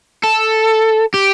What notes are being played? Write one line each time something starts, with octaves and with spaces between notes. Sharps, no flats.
A4
G4